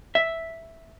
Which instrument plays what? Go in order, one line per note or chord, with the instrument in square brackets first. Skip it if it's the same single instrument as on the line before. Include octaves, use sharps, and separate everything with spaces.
[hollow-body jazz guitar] E5